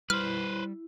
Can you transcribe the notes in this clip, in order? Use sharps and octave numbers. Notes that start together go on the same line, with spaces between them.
G3 E4 B4 C5 F6